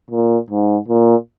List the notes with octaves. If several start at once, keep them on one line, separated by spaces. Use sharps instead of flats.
A#2
G#2
A#2